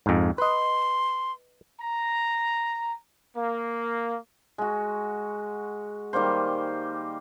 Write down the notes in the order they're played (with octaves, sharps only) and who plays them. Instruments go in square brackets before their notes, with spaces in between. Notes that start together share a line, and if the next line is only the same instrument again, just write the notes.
[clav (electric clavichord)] F2 G#2
[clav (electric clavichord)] B4 D#5 [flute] C6
[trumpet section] A#5
A#3
[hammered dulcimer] G#3 F#4
D#3 G3 A#3 C5